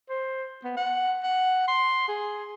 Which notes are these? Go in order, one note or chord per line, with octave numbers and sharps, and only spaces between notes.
C5
B3
F#5
F#5
C6
G#4